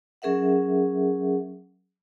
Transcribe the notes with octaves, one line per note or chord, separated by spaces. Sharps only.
F#3 C#4 G#4 A#4 E5 F#5